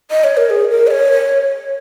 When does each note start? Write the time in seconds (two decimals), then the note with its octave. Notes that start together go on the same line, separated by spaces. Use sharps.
0.11 D#5
0.24 C#5
0.37 A#4
0.50 G#4
0.71 A#4
0.87 D#5
0.91 C#5